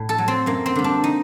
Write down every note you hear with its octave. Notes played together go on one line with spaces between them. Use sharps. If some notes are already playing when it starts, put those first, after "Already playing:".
Already playing: A2
A4
F#3
C4
F#2 A#3
C4
D3 G3
D4
D#4